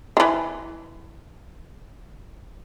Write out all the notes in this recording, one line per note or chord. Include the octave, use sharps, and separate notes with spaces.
D#3 E3